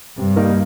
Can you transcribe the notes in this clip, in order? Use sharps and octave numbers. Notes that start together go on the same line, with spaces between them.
G2 C3
G3 A#3 D#4 A#4